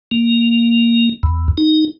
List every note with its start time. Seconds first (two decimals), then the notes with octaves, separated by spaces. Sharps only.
0.11 A#3
1.23 E2
1.58 D#4